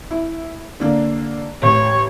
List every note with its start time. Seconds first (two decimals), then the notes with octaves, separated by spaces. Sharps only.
0.11 E4
0.80 D3 A#3 D4
1.63 A1 C#5